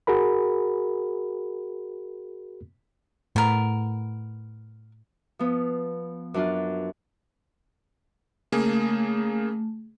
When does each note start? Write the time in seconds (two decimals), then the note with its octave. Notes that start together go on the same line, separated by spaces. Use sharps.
0.07 F#4 G#4 A#4 B5
3.36 A2 B3 A#4
5.39 F3 B3
6.34 F#2 D4 F4
8.52 C#3 A3 A#3 G#4